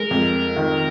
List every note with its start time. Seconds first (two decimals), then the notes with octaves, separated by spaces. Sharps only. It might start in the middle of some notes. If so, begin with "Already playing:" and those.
Already playing: G#3 A#4
0.11 F2
0.56 D#3